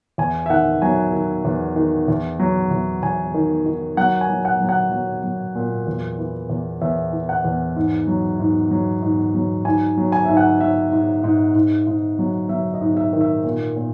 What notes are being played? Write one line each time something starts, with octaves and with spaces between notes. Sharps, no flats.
E2 G#5
E5
D#3 F#5
F#3 G#5
D#3
E2
D#3
E2
F#3
E2
E2 G#5
D#3
D#3
F#3 F#5
G#5
F#3
F#5
F#3
F#5
F#3
F#3
A#2
E2
E3
E2
E2 E5
E3
F#5
E2
G#2
F#3
G#2
F#3
G#2
F#3
G#2 G#5
F#3
G#5
G#2 E5
F#5
G#2 E5
G#2
G#2
G#2
G#2
F#3
F#3 E5
D#5
G#2
E5
D#3
E5
A#2
A#2